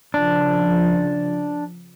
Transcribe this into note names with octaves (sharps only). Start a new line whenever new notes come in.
C#3 F3 D4